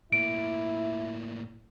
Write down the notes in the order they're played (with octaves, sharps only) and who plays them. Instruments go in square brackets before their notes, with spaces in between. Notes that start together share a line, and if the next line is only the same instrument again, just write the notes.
[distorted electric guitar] A2 A#3 [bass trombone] E4 [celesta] D7